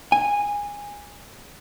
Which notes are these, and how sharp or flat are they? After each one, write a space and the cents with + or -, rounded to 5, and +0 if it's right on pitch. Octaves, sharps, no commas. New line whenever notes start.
G#5 -15